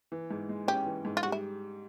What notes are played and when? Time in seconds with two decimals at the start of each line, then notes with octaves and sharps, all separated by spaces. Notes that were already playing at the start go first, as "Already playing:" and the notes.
0.12 E3
0.31 G#2
0.49 G#3
0.68 C#4 G4
0.86 E3
1.05 G#2
1.17 F4
1.23 G3 F#4
1.32 E4